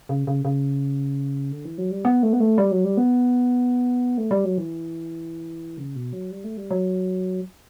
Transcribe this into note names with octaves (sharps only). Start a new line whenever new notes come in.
C#3
C#3
C#3
D3
E3
F#3
G3
B3
A3
B3
A3
G3
F#3
G3
B3
A3
G3
F#3
E3
C#3
B2
F#3
G3
A3
G3
F#3